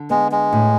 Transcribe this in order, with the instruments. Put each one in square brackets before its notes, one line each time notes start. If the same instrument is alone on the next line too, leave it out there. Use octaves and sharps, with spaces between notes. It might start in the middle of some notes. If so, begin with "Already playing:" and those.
Already playing: [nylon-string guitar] D3
[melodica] G#3 [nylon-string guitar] B3
[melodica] G#3
[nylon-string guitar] A2